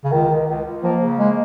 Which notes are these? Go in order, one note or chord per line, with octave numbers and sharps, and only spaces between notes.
C#3
C#2 D#3
C#2
C#2
C#2
F3 A#3
C#3
G#3 A#3